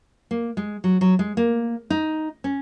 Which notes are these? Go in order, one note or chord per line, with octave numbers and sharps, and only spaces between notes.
A#3
G#3
F#3
F#3
G#3
A#3
D#4
C#4